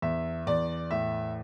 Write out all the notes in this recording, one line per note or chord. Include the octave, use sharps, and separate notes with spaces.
E2 E5
E2 D5
A2 E5